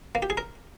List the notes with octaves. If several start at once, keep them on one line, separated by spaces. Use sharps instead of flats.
A#3
G4
G#4
A#4